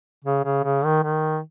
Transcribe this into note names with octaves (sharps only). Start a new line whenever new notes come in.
C#3
C#3
C#3
D#3
D#3